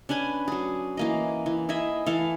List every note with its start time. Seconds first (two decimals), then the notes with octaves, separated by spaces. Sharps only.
0.09 C#4 D4 B4 G#5
0.48 F#3 G#4
0.97 E3 A#3 D#5
1.46 E3
1.69 E4 G#4 D#5 E5
2.06 E3 A4 F5